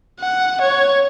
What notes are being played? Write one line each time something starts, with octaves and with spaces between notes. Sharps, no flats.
F#5
C#5